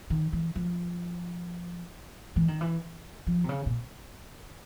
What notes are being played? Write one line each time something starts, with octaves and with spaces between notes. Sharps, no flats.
D#3
E3
F3
E3
D#3
E3
F3
C3
C#3
A#2